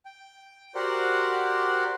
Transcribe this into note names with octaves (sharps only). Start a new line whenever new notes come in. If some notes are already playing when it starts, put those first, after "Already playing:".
G5
F#4 G4 A#4 C5 D5 F#5